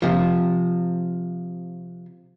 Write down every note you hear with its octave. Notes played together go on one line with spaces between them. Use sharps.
C3 F3